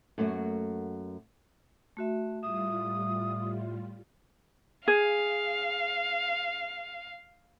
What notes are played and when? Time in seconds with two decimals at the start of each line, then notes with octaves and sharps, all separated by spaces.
0.18 F#2 A3 A#3 F#4
1.97 A3 F#4 E5
2.43 A2 G3 F4 E5 D#6
4.88 G#4 F5